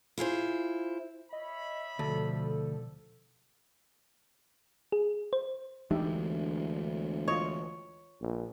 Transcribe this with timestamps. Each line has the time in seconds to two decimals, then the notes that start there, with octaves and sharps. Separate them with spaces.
0.18 E4 F4 G#4 C5
1.33 C#5 D#5 E5 B5
1.99 D2 B2 F3 A4
4.92 G#4
5.33 C5
5.91 D2 E3 G#3 D4 D#4 G4 E5
7.28 F4 C#5 D#5
8.21 A#1